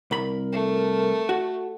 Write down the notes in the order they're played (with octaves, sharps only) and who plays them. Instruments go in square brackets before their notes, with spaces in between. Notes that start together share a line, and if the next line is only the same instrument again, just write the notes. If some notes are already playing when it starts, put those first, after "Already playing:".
[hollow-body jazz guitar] C2 B5 [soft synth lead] A#4
[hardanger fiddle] A3
[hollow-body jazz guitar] F#4